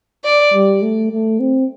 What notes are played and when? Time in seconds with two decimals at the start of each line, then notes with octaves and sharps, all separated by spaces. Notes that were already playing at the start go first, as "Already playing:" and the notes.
0.24 D5
0.54 G3
0.82 A3
1.11 A3
1.40 C4